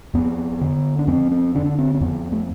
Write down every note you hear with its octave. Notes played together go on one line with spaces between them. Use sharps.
F2 B3
D3
D4
F2 C4
C4
D3 D4
D4
C4
C4
F2 B3
A3